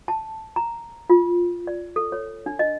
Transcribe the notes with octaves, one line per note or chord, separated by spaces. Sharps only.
A5
A#5
F4
D5
A4
C#5
D4
D#5